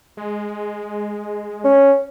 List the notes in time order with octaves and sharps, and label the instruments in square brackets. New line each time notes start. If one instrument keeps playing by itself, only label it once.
[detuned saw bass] G#3
[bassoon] C#4